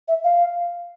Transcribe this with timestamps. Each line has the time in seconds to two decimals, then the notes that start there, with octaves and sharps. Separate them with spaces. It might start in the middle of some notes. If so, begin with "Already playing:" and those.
0.08 E5
0.24 F5